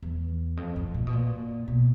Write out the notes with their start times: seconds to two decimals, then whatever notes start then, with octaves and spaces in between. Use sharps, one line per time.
0.02 E2
0.57 F2
0.76 F2
0.94 A#2
1.07 B2
1.13 A#2
1.68 B2